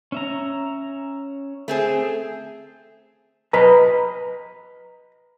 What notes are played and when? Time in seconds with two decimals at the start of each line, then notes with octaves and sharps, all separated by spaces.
0.12 C#4 E5 A#5
1.68 A3 C4 G#4
3.53 B4 D#5 A#5